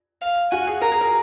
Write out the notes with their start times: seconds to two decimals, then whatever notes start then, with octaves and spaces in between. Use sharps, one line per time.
0.22 F5
0.51 F#4 G#5
0.67 G#4
0.82 A#4 A#5
0.92 G#4
1.01 A#4